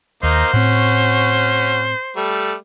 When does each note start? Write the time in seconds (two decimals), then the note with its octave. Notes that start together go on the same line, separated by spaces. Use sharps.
0.23 D#2 A#3 D#4 C5
0.53 A2 C4 C#4 F#4
2.17 G3 A3